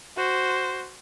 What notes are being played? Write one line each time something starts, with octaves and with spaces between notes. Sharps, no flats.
F#4 C5